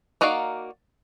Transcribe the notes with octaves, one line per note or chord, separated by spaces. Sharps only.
A#3 D#4 F#4 D5 F5